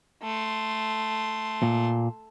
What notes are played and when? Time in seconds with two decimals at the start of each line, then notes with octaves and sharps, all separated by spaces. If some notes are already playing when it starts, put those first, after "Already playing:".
0.23 A3 C6
1.63 A#2